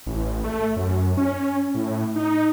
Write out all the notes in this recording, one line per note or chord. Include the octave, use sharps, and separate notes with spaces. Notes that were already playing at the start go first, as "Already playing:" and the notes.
A1
A3
F#2
C#4
A2
D#4